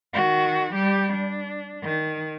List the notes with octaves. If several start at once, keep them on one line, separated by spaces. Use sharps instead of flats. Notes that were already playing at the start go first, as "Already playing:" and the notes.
D#3 F#4
G3 G4
D4
D#3